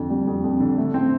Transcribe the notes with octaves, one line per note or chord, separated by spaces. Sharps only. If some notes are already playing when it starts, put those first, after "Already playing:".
Already playing: F2 D3
G3
F2
F2
D3
A3
C4